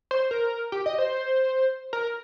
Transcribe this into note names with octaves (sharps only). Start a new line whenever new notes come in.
C5
A#4
G4
D#5
C5
A#4